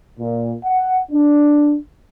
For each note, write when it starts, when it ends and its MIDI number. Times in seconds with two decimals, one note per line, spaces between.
0.19 0.52 46
0.65 0.97 78
1.11 1.76 62